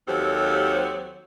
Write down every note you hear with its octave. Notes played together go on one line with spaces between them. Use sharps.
D#2 F#3 C4 G4 A4